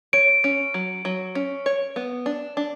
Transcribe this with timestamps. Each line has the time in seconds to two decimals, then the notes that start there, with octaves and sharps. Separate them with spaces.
0.13 C#5 D7
0.44 C#4
0.74 F#3
1.05 F#3
1.35 C#4
1.66 C#5
1.96 B3
2.26 D4
2.57 D4